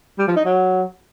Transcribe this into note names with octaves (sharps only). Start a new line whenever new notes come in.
G3
F3
D#4
F#3